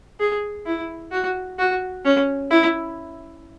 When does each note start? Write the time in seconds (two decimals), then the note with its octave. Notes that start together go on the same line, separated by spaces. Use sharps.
0.20 G#4
0.66 E4
1.12 F#4
1.59 F#4
2.05 C#4
2.51 E4